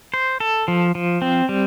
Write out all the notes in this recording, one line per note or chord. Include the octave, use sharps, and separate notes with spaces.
C5
A4
F3
F3
C4
G3